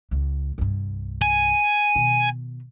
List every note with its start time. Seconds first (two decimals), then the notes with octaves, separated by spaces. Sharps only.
0.11 C#2
0.58 C2 G2
1.22 G#5
1.96 B2 D#3